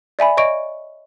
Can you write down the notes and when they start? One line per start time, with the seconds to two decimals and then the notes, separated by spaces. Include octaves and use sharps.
0.19 D5 E5 G#5 B5
0.37 C#5 D#5 C#6 D7